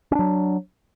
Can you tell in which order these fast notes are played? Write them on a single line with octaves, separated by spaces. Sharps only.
C#4 D4 F#3